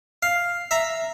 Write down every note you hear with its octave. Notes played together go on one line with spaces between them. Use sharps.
F5
E5 A#5